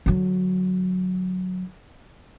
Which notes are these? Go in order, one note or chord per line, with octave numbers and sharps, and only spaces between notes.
D3 F#3